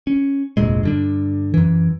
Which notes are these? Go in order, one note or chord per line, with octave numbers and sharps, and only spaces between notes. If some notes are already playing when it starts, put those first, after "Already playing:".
C#4
F1 D2 A#2 G#3
G2 D3 D4
F#2 E3